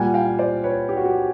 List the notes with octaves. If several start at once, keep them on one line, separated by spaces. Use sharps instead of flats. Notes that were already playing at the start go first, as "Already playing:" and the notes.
Already playing: A#2 G3 A#3 F#5 G#5
F5 G5
C5 D5
B4 C#5
G4
F#4
G4